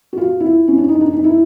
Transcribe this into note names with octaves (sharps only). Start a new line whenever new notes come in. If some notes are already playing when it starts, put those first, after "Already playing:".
F#4
F4
E4
C#4
D4
D#4
D4
D#4
E4